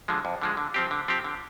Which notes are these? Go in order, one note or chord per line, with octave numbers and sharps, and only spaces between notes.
D3 F3 G#3
F2
D3 F3 G#3
D3
F3 C4 G4
D3
F3 C4 G4
D3